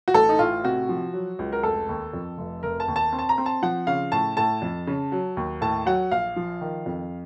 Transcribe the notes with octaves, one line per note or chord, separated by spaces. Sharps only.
F#4
A1 A4
D#4
A2 F4
C3 F#4
F3
F#3
C#2
A#4
F1 A4
D#2
F2
F1
F1 A#4
A5
D#2
A5
C4
A5
A#5
C4
A5
F3 F#5
C#3 F5
A2 A5
A2 A5
F2
C#3
F#3
D#2
A2 A5
F#3 F#5
A#1 F5
F3
D#3
F2